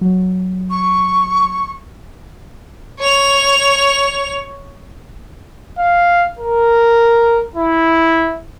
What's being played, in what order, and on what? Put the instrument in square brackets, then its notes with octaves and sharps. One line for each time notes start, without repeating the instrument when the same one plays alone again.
[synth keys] F#3
[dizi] C#6
[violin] C#5 F7
[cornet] F5
A#4
E4